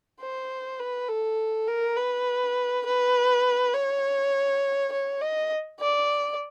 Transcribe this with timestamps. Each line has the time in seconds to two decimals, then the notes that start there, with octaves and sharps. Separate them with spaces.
0.21 C5
0.79 B4
1.09 A4
1.68 A#4
1.97 B4
2.86 B4
3.74 C#5
4.93 C#5
5.21 D#5
5.80 D5